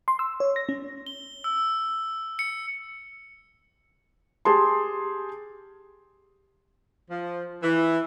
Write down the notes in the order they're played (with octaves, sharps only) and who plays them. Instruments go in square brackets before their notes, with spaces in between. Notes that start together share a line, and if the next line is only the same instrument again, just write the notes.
[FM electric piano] C6
E6
C#5
A#6
C#4
[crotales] G7
E6
C#7
[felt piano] G4 G#4 A5 C6
[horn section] F3
E3